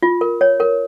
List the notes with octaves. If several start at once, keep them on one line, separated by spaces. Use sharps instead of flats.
F4
A#4
C#5
A#4